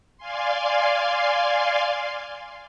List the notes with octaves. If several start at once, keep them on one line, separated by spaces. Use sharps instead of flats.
D5 F5 G#5 C6